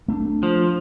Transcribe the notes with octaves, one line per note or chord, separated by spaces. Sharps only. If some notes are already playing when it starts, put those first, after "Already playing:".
A3 C#4 D4
F3